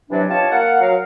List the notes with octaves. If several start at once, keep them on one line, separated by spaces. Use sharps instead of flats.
C3 E3 F#3 D4
F4 G4 C#5 D#5 A5
A#3 F5 F#5
F#3 A#4 F5